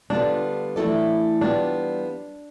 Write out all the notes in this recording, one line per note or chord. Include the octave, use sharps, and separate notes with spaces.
D3 G3 B3 D4 F4
E3 A3 E4 A4 D5
G3 B3 D4 F4